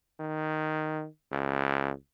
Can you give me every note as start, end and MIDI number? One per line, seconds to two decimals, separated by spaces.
0.20 1.07 51
1.32 1.92 37